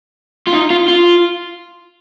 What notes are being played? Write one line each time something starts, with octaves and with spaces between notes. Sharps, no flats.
F4
D#4
F4
F4